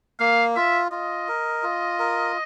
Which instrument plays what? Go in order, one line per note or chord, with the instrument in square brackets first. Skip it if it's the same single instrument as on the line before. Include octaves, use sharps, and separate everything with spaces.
[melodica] A#3 [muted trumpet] F5
[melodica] F4 [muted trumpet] E5
[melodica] F4 [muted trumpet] D#5
[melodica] A#4
F4
A#4